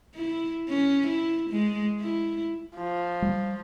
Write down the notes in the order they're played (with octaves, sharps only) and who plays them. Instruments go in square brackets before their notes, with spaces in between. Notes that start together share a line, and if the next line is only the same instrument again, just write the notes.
[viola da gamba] E4
C#4
E4
G#3
E4
[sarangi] F3
[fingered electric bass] G3